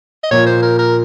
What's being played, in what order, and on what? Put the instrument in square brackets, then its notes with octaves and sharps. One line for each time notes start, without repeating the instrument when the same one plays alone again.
[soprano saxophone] D#5
[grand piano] A#2 F3 A#3 F4 [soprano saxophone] C#5
[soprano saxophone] C5
A#4
A#4